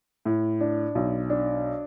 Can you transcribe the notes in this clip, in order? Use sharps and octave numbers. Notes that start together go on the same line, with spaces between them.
A2
D4
B1
D4